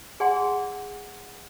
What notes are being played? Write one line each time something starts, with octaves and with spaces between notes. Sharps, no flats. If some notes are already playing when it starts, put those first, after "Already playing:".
G#4 D5 F#5 G#5 C6